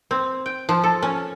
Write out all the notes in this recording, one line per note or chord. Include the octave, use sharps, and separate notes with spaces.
C4
G5
F3
A4
C#4